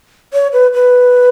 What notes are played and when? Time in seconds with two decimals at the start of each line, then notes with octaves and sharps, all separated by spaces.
0.33 C#5
0.53 B4
0.74 B4